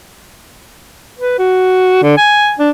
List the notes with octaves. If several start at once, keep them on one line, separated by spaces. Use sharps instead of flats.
B4
F#4
D3
G#5
D4